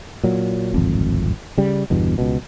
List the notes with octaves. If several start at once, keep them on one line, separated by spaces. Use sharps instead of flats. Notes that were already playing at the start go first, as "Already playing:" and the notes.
A#2 F#3
D1 G#1 F2
C#3 G3
G1 E2 G2 B2
C#2 B2